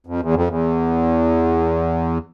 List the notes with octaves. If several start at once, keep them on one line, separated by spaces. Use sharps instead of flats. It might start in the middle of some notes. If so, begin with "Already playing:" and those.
F2
E2
F2
E2